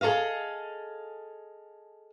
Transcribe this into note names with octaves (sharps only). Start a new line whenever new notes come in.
G#4 A4 C5 D#5 F5